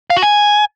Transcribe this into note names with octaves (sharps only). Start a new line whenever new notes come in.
F5
F#4
G#5